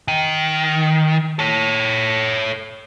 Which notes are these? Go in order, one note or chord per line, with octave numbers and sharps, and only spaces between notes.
D#3
A4 C#5